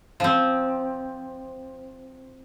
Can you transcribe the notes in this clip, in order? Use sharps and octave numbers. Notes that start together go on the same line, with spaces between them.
F3 C4